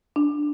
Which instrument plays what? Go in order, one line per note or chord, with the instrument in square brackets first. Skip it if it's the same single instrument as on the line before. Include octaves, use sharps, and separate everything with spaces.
[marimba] D4